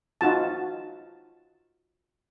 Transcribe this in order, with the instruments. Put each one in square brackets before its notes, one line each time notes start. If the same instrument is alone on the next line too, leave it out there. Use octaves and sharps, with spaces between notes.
[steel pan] D#4 F4 F#4 A5